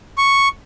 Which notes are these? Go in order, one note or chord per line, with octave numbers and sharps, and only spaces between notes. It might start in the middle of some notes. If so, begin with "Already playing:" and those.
C#6